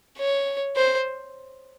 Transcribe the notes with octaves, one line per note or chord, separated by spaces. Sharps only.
C#5
C5